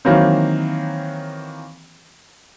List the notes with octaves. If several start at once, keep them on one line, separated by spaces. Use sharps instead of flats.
D#3 E3 F#3 A#3 C4